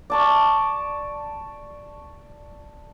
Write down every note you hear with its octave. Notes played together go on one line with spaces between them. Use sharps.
D5 A5 C#6